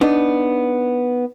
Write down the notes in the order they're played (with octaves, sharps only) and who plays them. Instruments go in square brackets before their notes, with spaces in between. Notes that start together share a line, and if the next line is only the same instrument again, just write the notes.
[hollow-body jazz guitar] B3 D4 D#4